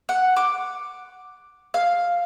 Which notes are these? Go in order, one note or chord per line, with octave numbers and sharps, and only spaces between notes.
F#5
D6
F5